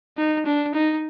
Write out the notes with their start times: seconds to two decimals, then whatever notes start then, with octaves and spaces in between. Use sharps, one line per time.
0.18 D#4
0.46 D4
0.75 D#4